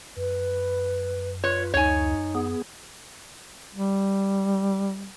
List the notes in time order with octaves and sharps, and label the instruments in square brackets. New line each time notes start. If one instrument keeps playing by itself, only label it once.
[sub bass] F#2 [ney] B4
[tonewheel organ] F4 B4 [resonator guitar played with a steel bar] C#5
[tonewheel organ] D2 [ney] D#4 [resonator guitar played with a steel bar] C#5 G#5
[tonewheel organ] B3 G#4
[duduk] G3